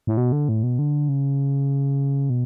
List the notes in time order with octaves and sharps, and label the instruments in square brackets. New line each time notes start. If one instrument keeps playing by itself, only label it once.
[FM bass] A2
B2
D3
A2
B2
D3
C#3
B2